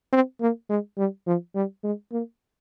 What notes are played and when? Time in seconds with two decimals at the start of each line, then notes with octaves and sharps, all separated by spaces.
0.13 C4
0.41 A#3
0.69 G#3
0.98 G3
1.26 F3
1.55 G3
1.84 G#3
2.12 A#3